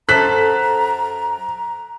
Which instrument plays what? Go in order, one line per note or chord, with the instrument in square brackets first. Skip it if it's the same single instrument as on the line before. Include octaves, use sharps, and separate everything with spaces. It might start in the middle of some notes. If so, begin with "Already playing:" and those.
[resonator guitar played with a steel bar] F#2 A4 C5 [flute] A#5 [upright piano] F#6 B6